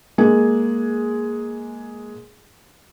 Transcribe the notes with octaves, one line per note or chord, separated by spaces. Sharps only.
G#3 A#3 G#4